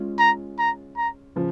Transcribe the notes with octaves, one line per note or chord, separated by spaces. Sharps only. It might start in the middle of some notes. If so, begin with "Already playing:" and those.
Already playing: G#3 C#4 F4
A#5
A#5
A#5
C#3 F3